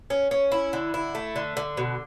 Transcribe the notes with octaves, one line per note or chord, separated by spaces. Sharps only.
C#4
C#4
E4
D3
E4
A3
D3
D3
B2